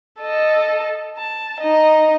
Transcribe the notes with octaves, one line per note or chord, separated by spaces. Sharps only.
A4 D#5
A5
D#4 D#5